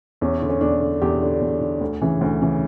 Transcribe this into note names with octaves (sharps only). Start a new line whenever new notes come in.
E2 C#4
D3
C#4
E2 D4
D3
E2 G4
D3
E2
D3
D2
C#3 E3
D2
C#3 E3